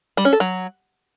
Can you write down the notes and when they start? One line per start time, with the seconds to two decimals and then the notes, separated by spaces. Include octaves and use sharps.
0.17 G3
0.25 C#4
0.33 A4
0.40 F#3